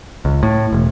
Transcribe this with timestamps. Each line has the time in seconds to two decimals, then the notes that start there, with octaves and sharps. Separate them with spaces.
0.25 C#2
0.43 A2
0.73 E1